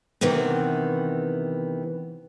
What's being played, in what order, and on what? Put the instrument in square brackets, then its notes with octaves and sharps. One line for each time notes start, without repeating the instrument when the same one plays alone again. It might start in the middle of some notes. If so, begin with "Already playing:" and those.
[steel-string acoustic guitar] C3 D#3 E3 B3 C4